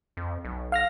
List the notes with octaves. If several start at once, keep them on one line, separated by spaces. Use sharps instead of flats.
F2
B1
F5 F6 A#6